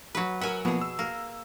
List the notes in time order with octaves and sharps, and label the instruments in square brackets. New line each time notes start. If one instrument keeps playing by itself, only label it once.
[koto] F#3 B4
[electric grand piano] A#4 F#5 [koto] E5 G#5
[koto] B2 G#4 [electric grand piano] F3 A#3 B3
[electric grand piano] E6
[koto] A#3